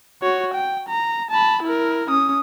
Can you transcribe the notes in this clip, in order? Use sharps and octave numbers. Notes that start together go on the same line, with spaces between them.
F#4 C#5
G5
A#5
A5 B5
E4 A#4
C#4 D#6